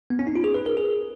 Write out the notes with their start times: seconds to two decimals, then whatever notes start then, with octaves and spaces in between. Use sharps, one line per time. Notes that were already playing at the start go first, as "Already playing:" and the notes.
0.10 B3
0.19 C#4
0.27 D#4
0.36 F4
0.44 G#4
0.54 B4
0.66 A#4
0.77 G#4